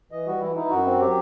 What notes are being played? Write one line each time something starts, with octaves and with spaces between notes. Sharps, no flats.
E3 D#5
G3 F#4
E3 E4
D#4 E4
F#2 F#4
C4
F#3 G4